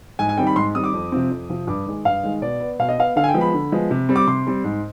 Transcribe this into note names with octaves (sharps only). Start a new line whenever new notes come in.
G#2 G#5
G#5
D#3 G3 C4 G5
B5
G#2 C6
D#3 G3 C4 D#6
D6
F2
C3 F3 C4
F2
C3 F3 C4
G2 D6
D#3 G#3
G2 F5
D#3 G#3
B2 D5
B3
B2 F5
D#5
B3 F5
D3 F5
G#5
G5
F3 G#3 B3
B5
D3
F3 G#3 B3
C3
G3 C4
D6
C3 C6
G3 C4
G#2